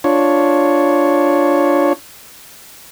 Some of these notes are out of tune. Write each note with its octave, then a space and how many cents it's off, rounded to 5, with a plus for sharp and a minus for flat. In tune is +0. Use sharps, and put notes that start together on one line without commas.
D4 +0 F4 +0 C#5 +0